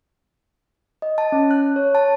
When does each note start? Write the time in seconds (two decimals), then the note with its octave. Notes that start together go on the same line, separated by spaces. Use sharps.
1.02 D#5
1.18 A5
1.32 C#4
1.51 F#6
1.76 C#5
1.95 A5